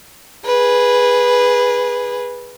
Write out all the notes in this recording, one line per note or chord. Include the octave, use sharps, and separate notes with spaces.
G#4 B4